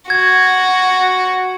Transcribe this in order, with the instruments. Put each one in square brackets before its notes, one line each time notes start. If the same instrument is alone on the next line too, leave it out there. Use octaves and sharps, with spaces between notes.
[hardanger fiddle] F#4 [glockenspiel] G#6